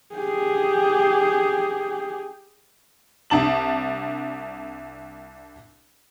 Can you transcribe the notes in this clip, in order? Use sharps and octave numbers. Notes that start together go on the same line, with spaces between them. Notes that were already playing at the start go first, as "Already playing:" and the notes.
G4 G#4
C2 D4 A5 F#7